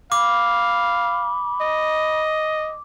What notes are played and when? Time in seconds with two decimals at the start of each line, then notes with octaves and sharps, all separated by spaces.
0.12 F5 B5 D6
1.61 D#5